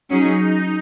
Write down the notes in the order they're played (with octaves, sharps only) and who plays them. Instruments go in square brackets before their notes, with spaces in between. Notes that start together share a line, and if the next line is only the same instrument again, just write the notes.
[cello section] F#3 C#4 G#4 [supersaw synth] D#4